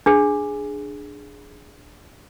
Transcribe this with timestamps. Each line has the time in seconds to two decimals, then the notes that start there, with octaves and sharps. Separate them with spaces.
0.06 D4 G#4